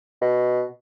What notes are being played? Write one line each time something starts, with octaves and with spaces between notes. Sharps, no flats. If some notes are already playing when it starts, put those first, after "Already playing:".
B2